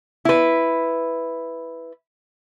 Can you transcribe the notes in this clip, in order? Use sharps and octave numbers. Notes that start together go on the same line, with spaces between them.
E4 B4